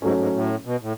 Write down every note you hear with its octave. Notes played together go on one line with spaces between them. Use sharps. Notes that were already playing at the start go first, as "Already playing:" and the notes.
G#2 F#3 A3 C#4
G#2
A2
B2
A2